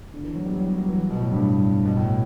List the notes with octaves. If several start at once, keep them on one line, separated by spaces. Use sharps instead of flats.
D3
E3
F#3
G3
F#3
G3
F#3
E3
B2
A2
G2
B2
A2